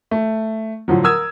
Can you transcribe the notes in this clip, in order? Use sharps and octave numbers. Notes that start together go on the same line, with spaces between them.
A3
A2 D3 F3 F#3
A#4 D#6 E6 G#6